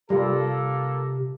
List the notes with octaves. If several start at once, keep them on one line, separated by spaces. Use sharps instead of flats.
C3 G3 A#3 F4 A4